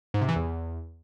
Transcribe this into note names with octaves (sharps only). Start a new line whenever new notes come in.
G#2
C3
E3
E2